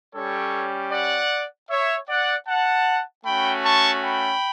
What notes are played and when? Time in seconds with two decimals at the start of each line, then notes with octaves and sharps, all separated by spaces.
0.14 G3 C#4 G4 A4 C#5
0.92 D5 F#5
1.70 C#5 E5
2.08 D5 F#5
2.47 F#5 A5
3.25 A3 C#4 F#4 G5 B5
3.64 A5 C#6
4.03 G5 B5